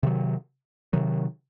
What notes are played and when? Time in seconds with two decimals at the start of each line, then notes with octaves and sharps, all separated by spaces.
0.03 C3 D#3 F#3
0.93 C3 D#3 F#3